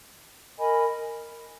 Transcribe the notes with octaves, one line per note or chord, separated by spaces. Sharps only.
A#4 D#5 G#5 B5